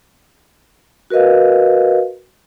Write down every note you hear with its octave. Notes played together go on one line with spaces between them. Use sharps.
F#4 A#4 B4 D#5 F5